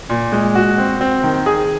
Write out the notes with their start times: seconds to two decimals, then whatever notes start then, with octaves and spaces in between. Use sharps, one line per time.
0.10 A#2
0.32 G#3
0.55 F#4
0.78 C4
1.01 C4
1.24 D#3
1.46 G#4